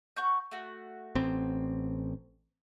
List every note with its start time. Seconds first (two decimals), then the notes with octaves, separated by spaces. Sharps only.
0.16 F#4 C#6 G6
0.51 A3 F#4
1.15 A1 C4